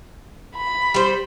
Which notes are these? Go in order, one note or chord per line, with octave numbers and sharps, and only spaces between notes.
B5
G3 C5